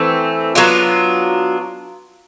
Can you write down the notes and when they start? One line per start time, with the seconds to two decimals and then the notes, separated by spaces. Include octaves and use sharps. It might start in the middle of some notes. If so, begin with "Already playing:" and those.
Already playing: E3 A3 C4
0.55 F#3 B3 D4 F4